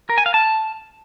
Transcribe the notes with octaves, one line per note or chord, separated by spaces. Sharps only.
A#4
G#5
F5
A5